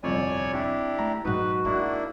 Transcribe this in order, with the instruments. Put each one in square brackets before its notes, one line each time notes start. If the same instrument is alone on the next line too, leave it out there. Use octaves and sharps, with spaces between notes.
[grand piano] G1 C2 F2 [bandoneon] C#5 D5 G#5
[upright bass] C4 [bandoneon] D4 E4 G4
[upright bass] A3 [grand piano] A#5
[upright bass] G#2 F#3 [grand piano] D#4 [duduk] F#4 [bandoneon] B4
[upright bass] G#3 [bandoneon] A#3 D4 E4